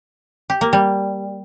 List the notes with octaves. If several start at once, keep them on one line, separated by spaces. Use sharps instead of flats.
G4
A#3
G3